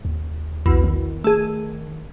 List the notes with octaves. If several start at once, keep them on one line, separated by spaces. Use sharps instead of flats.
D#2
B1 E2
D#3
A3 G#4